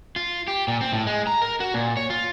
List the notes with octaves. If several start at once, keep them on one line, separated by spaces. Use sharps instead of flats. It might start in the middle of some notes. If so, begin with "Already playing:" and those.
F4
G4
A#2
C4
A2
G#3
A#5
A#4
F#4
A#2
C#5
F4